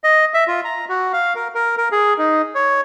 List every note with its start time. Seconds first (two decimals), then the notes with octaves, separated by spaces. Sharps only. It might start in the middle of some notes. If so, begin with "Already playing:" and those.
0.04 D#5
0.34 E5
0.48 F4
0.65 A#5
0.89 F#4
1.13 F5
1.36 A#4
1.55 A#4
1.78 A#4
1.92 G#4
2.18 D#4
2.55 C#5